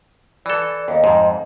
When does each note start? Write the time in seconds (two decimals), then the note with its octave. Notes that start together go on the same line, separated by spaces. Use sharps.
0.46 E3 A4 D5
0.88 D#2 D#5
1.04 F2 G#2